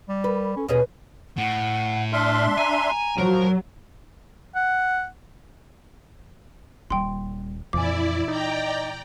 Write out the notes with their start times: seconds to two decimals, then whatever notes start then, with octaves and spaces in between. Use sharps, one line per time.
0.09 G3
0.24 A#4 B4
0.57 C#4 A4
0.68 D#2 B2 C#4 G#4 B4
1.38 A2 F#5
2.13 D4 E5 C6 F6
2.58 G#5 A#5
3.18 F3 F#3 A#4
4.55 F#5
6.90 D#1 G3 G5 C6
7.73 F2 A#2 E3 E4 D5 G#5 D6
8.28 D#4 D5 G5 A#5